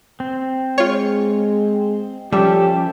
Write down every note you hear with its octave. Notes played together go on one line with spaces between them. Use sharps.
C4
G#3 F4 C#5
F3 G3 C#4 G4 A4 E5